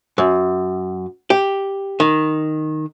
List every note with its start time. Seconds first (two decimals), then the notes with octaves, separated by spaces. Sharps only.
0.18 F#2
1.30 G4
2.00 D#3